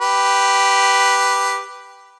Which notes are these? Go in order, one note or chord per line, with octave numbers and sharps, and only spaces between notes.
G4 B4